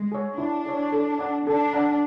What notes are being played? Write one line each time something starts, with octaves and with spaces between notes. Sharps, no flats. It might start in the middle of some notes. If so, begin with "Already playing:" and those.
Already playing: G#3
G#4 C#5
D4 E4
G#4 C#5
A4
D5 F#5 A#5
D4 A4
D5 F#5 A#5